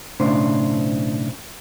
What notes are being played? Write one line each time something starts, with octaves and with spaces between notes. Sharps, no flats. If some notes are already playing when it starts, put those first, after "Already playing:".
B1 A2 C#3 D4 C5